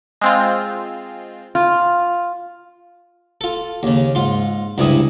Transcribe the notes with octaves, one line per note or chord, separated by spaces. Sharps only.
G#3 C4 F4
F4
F4 A4
D#2 C#3
G#2 F4 C6
C#2 G2 C3 E4 G#4 D#6